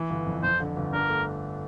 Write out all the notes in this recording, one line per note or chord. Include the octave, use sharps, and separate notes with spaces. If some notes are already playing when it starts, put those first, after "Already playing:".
Already playing: E3
G1
F2
F2 C5
D3
G1
D4 A#4
A3